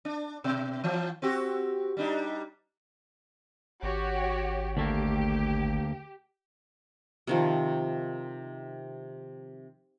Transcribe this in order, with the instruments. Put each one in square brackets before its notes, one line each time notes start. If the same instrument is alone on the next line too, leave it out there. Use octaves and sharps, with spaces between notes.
[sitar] D4
B2
E3 F3
C4 F#4 G4
G3 D4 D#4
[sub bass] G#1 [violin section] F#4 G4 C#5
[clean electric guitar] D2 A3 A#3 [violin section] G4
[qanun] C3 D#3 F3